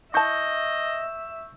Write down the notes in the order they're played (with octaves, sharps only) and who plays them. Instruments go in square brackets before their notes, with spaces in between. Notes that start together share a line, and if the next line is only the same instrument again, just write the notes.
[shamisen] E4 A5 [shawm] D#5 [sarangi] E5 [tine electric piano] C#6 G6